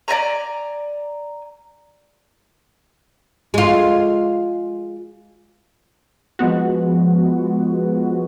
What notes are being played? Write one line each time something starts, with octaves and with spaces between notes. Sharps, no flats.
D5 D#5 G#5 A#5
G#3 F4
F3 G#3 B3 F#4